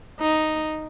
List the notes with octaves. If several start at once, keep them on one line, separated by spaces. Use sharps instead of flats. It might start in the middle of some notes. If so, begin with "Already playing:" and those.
D#4